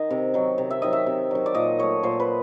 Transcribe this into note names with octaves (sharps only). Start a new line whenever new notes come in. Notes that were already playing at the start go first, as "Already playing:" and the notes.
Already playing: D#3 D#5
C3
D#3 F#3
C3
E5
D#3 F#3 D#5
E5
C3
D#3 F#3
D5
A#2 D#5
F#3 A3 C#5
A#2 C5
B4